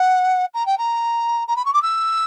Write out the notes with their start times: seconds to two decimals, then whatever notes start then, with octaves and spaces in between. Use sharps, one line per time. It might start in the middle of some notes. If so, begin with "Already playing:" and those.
Already playing: F#5
0.54 A#5
0.66 G5
0.78 A#5
1.47 A#5
1.56 B5
1.65 C#6
1.73 D6
1.82 E6